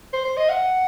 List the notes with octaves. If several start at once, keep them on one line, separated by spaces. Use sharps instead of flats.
C5
C5
D#5
F#5